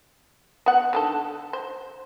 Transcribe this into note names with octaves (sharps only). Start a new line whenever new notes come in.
B3 F#5
D3 D#3 A4
C5